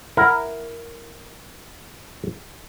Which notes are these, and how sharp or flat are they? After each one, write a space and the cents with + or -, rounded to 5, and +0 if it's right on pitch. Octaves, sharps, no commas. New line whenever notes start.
E4 +0 A#4 +0 F#5 +0